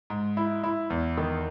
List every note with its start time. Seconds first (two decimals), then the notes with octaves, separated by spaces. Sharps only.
0.10 G#2
0.37 E4
0.63 E4
0.90 E2
1.17 D#3